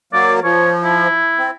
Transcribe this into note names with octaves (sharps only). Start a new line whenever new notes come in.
F#3 A#3 D5
F3 C#5
E4
C4